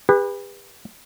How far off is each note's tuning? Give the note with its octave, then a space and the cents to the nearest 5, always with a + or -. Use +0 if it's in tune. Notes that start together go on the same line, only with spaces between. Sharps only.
G4 +45 B4 -10